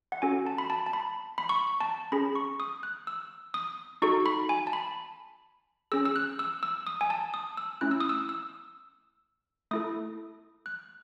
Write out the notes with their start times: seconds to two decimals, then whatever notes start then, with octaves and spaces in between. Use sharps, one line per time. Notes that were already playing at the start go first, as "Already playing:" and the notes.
0.12 F#5
0.22 C#4 F#4 A4 G#5
0.47 A5
0.58 B5
0.70 A5
0.86 A5
0.93 B5
1.38 B5
1.49 C#6
1.81 A5
2.12 C#4 G#4 B5
2.35 C#6
2.60 D#6
2.83 F#6
3.07 E6
3.54 D#6
4.02 D#4 F#4 A4 C#6
4.26 B5
4.49 G#5
4.67 A5
4.73 B5
5.92 C#4 G#4 E6
6.05 E6
6.16 F#6
6.39 E6
6.63 E6
6.87 D#6
7.01 G#5
7.10 A5
7.34 D#6
7.57 E6
7.81 A3 C#4 E4 F#6
7.91 E6
8.00 D#6
8.09 E6
8.29 E6
9.71 A3 E4 A4 D#6
10.66 F#6